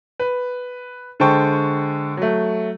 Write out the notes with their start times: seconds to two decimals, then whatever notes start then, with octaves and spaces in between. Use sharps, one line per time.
0.20 B4
1.20 D3 G#3 C5 G5 A5 C#6
2.17 F#3 A3